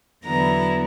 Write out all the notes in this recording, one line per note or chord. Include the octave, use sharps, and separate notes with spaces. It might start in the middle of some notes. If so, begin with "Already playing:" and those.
E2 D3 F#3 B3 E4 A#5